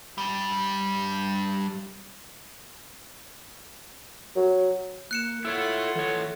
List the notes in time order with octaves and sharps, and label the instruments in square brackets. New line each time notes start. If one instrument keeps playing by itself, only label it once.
[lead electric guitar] G2 G3
[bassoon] F#3
[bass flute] A#3 [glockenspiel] F#6 C#7 E7
[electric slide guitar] E4 C#5 [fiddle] F4 F#5 [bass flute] A4
[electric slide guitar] E3 C#5 [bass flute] A4